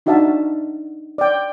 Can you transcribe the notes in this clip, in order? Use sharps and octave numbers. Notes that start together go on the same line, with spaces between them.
D4 D#4 F#4 E5 F5 A5
D5 G5